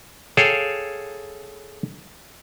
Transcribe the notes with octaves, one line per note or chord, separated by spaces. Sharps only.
G#4 A4 C#5 F5 G5